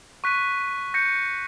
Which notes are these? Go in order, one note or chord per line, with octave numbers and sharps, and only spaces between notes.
C#6 F#6 B6 D#7
G6 A#6 C#7